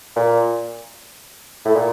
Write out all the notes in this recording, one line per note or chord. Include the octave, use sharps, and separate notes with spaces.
A#2
A2
A#2